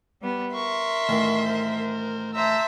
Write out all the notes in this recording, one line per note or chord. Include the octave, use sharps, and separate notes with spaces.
G3 B3
A#4 E5 C6 C#6
A1 D#3
A#4 C5
C5 E5 A5 A#5 E6